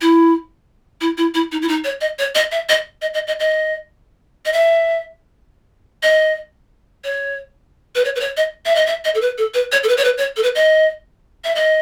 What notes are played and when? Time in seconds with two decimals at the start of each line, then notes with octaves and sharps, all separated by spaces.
0.01 E4
1.01 E4
1.18 E4
1.34 E4
1.52 D#4
1.62 E4
1.68 D#4
1.84 C#5
2.01 D#5
2.19 C#5
2.35 D#5
2.52 E5
2.69 D#5
3.02 D#5
3.14 D#5
3.27 D#5
3.40 D#5
4.45 D#5
4.53 E5
6.03 D#5
7.04 C#5
7.95 B4
8.05 C#5
8.16 B4
8.20 C#5
8.37 D#5
8.65 E5
8.76 D#5
8.86 E5
9.05 D#5
9.15 A4
9.21 B4
9.38 A4
9.54 B4
9.72 C#5
9.83 A4
9.89 B4
9.97 C#5
10.05 B4
10.18 C#5
10.37 A4
10.43 B4
10.55 D#5
11.44 E5
11.55 D#5